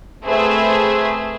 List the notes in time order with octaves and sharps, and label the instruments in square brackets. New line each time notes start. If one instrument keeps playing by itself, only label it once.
[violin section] A3 C4 G#4 B4 E5